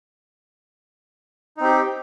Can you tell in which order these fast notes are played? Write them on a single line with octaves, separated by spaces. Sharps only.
D#4 C4 G4